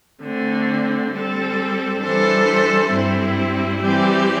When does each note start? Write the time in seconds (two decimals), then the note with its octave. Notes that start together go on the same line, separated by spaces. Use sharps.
0.22 D3 A3 C4
1.11 G3 C4 A4
2.01 E3 G3 D4 A4 C5
2.90 G2 G3 C4 E4
3.80 E3 G3 C4 G4 D5